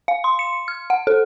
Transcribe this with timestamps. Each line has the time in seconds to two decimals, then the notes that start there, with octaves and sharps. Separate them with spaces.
0.08 F5
0.24 C6
0.39 C#7
0.68 F6
0.90 F#5
1.07 A4